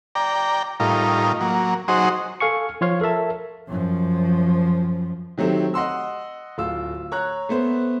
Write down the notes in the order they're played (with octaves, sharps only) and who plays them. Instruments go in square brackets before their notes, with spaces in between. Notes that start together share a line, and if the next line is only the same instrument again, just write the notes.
[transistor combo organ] D5 G5 A#5
A2 G3 D#4 F4 A#4
F#3 A#3
F#3 D#4 F#4 G#4 C5
[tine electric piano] A4 F5 G#5 C#6 C#7
F3 F4 C#5 F5
A4 A#4 E5 A5
[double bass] F#2 F3
[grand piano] D#3 F#3 A3 C4 G4
D#5 F#5 C6 E6
D1 F4 E6
C#5 A#5 F#6
A3 B3 C5